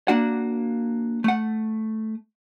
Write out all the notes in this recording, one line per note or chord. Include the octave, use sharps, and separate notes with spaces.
A#3 D4 F#4 F#5
A3 F#5